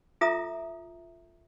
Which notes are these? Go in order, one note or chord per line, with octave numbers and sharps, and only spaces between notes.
F4 A4 E5 A#5 D#6